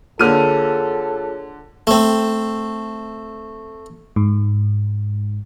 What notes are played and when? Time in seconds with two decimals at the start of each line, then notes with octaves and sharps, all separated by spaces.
0.19 D3 A#3 F4 G#4 A4 C#5 F6 D#7
1.87 A3 C4
4.16 G#2